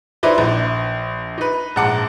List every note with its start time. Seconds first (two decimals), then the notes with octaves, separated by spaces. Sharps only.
0.23 D#4 E4 B4 C5 D5
0.38 A#1
1.38 D#4 B4
1.76 A#1 G#2 G#3 F#5 A5 D6